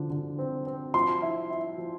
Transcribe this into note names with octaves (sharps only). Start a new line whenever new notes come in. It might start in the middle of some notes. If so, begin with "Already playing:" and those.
Already playing: D3 F3
D3
C4
C4
F3 C6
E4
E4
F3